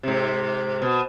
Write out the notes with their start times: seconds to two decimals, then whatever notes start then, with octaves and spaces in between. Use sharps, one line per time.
0.03 G#2 C3
0.82 B2